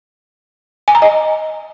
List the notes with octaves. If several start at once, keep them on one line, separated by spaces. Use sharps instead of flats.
G#5
A#5
D#5